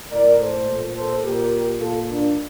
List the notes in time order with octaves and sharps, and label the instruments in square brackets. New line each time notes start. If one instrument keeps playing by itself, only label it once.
[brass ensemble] A2 A#4 D5
A4 C5
A#2
A4 C5
A#2 G4 A#4
A#2 F4 A4
A#3 D4